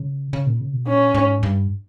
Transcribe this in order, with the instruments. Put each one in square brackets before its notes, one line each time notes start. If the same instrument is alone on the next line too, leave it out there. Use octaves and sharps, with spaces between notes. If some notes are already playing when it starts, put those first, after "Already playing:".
Already playing: [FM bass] C#3
C#3
A#2
C#3
B2
[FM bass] A#2 [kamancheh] C#4
[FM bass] G#2
G2